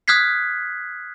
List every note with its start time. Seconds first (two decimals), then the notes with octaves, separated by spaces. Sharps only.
0.08 D#6 F6 F#6 G#6 B6 C7